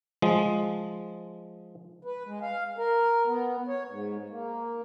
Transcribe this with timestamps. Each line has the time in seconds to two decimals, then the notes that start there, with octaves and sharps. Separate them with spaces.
0.22 F3 G#3
2.05 B4
2.26 G#3
2.42 F5
2.78 A#4
3.25 B3
3.68 C#5
3.88 G#2
4.29 A#3